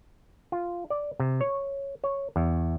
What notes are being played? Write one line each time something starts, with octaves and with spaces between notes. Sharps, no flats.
F4
D5
C3
C#5
C#5
E2